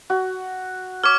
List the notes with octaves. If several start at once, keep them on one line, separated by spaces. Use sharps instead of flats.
F#4
C#5 D6 F6